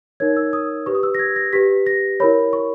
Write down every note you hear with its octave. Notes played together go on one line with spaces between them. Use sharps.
D#4 A#4 C#5 G#6
E6
D#6
G4 B4 C#6
D#6
E6
A#6
G#6
A#6
G4 B4 B6
A#6
E4 A#4 C#5 B5
C#6